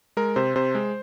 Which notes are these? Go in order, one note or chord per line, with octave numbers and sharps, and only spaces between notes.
G#3 A#4
C3 C5
C3 C5
G#3